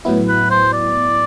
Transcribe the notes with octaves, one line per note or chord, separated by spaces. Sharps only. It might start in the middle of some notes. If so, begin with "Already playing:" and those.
A2 F#3 B3 E4
B4
C5
D5